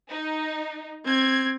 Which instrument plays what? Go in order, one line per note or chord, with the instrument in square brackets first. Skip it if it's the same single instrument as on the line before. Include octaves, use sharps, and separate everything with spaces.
[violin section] D#4
[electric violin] C4 [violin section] G#6